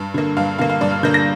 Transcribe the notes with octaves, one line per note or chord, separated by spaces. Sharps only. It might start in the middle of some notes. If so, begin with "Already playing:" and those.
Already playing: G2
D3 A#3
G2 F5
D3 A#3 F5
F5
G2 D5
F6
D3 A#3 G6
A#6